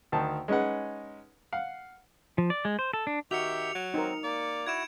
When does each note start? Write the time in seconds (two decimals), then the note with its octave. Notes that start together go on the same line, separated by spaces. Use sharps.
0.12 D2 D#3 A5
0.48 G#3 C#4 D#4 B4 F#5
1.53 F5 F#5
2.38 F3
2.50 D5
2.65 G#3
2.79 C5
2.93 A4
3.07 D4
3.31 D#3 F#4 G4 E5 G6 C#7 F7
3.75 F#3
3.94 C4 D#4 A#4
4.23 A#3 D5
4.67 E4 F#4 G#6 D7 E7